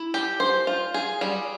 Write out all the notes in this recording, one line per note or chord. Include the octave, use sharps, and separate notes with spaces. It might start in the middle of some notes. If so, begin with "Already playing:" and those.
Already playing: E4
G4
C5
F4
G#4
G3